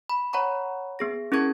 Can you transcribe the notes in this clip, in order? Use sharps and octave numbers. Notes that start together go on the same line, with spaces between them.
B5
C#5 F#5 A#5 B5 C#6
B3 G#4 A#6
C#4 E4 G#4 A#4 C#6 G#6